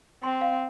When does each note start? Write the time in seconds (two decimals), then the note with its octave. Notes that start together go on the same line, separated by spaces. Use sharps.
0.23 C4 C6
0.41 F5